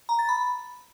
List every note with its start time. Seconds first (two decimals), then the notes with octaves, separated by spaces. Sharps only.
0.09 A#5
0.19 A6
0.29 B5